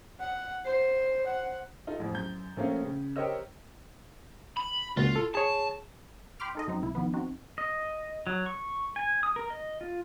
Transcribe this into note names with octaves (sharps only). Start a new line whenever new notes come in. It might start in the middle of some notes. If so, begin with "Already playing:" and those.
F#5
C5
F#5
D#4 F4 A4
A1 F2
F#2 G6
A#1 A3 A#3 C#4 F5
C#3
G4 A#4 C5 C#5 D#5 E6
B5
C#2 A#2 F4 F#4
A4
G#4 C#5 A5
G5 B5 C6 D6 F6
D#4 A4 D#5
F#2 F#3 C4 D#4
C2 E4
D#3 F3 B3
C4 D#4 F#4
D#5
F#3
C#6
G#5
D#6
A#4
D#5
F4